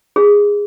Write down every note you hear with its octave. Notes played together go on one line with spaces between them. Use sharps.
G#4